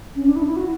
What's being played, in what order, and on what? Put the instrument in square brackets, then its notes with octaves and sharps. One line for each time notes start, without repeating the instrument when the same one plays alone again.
[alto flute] C#4
D4
E4
E4
F#4